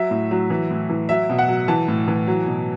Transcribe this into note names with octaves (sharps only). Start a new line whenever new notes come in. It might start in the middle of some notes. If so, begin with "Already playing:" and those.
Already playing: F#3 E5
A2
F#3
E3
A2
E3
F#3 E5
B2
F#5
F#3
E3 A5
A2
E3
F#3
B2